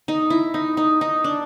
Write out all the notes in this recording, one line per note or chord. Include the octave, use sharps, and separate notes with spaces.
D#4
E4
D#4
D#4
D#4
D4